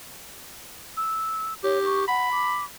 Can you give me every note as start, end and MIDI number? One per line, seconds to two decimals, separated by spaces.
0.97 1.53 88
1.64 2.08 67
1.64 1.79 73
1.85 2.06 85
2.08 2.29 78
2.08 2.64 83
2.31 2.64 86